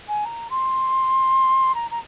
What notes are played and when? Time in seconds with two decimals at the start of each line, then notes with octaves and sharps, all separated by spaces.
0.08 G#5
0.25 A#5
0.50 C6
1.75 A#5
1.91 A#5